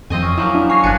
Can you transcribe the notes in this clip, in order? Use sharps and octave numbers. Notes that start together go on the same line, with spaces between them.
F2 F3 C4 D#5 G#5
C#4
F3 F#3 A#3 E4
D4 E4
C#5 G#5 C#6 A#6 C7
G1 G2 D4 G#5 F#6 C#7